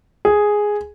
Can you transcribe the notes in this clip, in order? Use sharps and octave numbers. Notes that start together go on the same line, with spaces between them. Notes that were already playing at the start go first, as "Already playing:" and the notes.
G#4